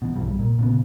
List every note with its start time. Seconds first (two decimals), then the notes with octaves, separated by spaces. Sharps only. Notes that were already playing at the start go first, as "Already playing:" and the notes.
0.02 B2 E3
0.16 B1 G2 G3
0.39 A#2
0.59 A#2 C#3 B3